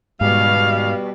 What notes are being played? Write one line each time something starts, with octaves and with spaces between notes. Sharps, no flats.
G#2 B2 G3 F5